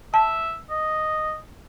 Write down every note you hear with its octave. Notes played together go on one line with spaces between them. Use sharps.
E5 A5
D#5